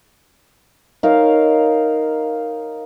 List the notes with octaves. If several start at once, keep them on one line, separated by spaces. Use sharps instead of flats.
D#4 A#4 C#5 F5